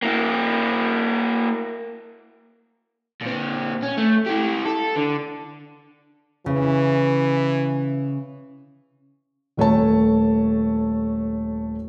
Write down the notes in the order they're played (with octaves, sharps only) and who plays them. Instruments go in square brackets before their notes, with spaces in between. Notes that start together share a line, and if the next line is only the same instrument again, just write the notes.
[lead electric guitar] A#3 E4
[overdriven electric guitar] A#2 C4
C#4
A3
E4 G4
A4
D3
[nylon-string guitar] C#3 [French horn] E3
[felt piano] D#1 A3 C#5 A5